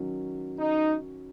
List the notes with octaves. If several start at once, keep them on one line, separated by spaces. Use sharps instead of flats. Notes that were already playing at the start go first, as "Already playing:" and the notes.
Already playing: D#3 F#3 C#4
D#4